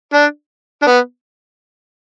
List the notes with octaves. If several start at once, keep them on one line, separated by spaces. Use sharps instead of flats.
D4
D4
B3